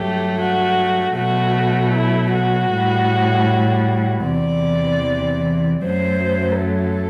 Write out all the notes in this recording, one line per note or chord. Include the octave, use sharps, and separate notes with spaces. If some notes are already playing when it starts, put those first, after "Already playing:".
Already playing: G2 F#3 A3 G4
F#4
B2 F#3 A3 F#4
E4
F#4
A2 G3
E2 C3 E3 D5
F#2 F#3 A3 C5
A4